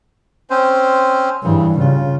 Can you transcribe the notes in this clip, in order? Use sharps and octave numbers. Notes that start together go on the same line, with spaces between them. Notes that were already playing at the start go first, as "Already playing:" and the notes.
C4 C#4 C5
G2 C#3 E3
C#3 F4